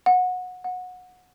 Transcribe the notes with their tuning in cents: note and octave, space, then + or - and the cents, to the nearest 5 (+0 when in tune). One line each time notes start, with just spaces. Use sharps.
F#5 -20
F#5 -20